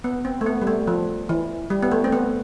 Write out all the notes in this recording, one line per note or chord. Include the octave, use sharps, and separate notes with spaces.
B3
C4
A3
B3
G3
A3
F3
E3
G3
B3
A3
C4
B3